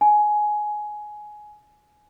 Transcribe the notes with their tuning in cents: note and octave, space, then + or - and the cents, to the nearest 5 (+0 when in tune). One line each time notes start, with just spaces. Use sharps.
G#5 +15